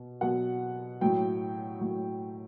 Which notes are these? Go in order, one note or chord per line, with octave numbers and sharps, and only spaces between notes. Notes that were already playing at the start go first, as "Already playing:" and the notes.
Already playing: B2
B2 F#3 F#5
A2 F#3 G5
A2 F#3